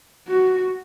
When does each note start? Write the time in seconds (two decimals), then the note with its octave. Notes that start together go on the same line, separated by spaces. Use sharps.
0.28 F#4